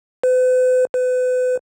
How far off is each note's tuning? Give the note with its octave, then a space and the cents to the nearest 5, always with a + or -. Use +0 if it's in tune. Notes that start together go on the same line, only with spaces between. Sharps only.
B4 +45
B4 +35